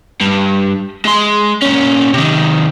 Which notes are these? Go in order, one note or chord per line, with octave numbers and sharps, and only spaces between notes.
G2
G#3 C6
A#2 C#4
C3 D#3